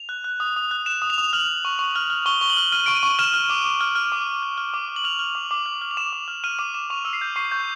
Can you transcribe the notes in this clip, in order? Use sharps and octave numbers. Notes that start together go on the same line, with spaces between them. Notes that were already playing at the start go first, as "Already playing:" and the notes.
Already playing: F7
F#6
F#6
D#6
D#6
F#6
F#6 E7
D#6
F7
D#6
F6 F#7
F6
C#6
C#6
F6
F6
C#6 G7
C#6 G7
F#7
F6
F6 D#7
C#6 D7
D#7
C#6
F6 E7
F6
D6
D6
F6
F6
D6
D6
F6
F6
D6
D6
F#7
F6 F7
F6
D6
D6
F6
F6
F7
D6 E7
D6
F6
F6 D#7
D6 D#7
D6 E7
C#6 F7
E6
C7
G6
C#6 C7
C#6 G6